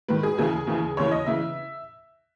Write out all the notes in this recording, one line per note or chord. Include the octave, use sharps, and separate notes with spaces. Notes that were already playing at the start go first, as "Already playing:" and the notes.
G#2 D#3 B4
G#4
D#2 C#3 E3 G#4
D#2 C#3 E3
D#2 C#3 E3 C#5
D#5
C#3 E3 E5